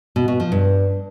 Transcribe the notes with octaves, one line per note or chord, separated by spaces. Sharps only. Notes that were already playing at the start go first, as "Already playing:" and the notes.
B2
B2
F3
G2